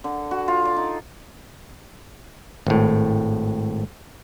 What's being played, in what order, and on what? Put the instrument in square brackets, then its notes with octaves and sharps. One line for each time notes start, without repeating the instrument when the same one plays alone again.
[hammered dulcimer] D3
F#4
F4
D5
D#4
[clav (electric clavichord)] G#1 A2